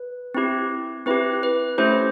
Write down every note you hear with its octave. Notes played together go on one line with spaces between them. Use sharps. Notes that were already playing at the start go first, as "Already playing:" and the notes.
Already playing: B4
C4 E4 G4
C4 E4 G4 B4
B4
A3 C#4 E4 G4 C5